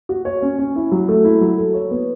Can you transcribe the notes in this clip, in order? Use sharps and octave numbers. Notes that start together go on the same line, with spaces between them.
F#4
C#5
C#4
C#4
E4
F#3
A3
E4
F#3
A4
C#5
B3